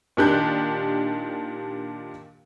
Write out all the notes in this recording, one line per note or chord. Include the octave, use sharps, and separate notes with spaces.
A#2 D#3 D4 G4 F#6 G6